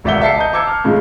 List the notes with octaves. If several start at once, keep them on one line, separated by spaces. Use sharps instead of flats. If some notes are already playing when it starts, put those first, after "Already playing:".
E1 C#2 D5 E5 F#5 G7
E5 A5 C7 C#7
D#5 A#5 D#6 G6
A5 D6 E6 G#6 C#7
F6
A2 C#3 G#3 F4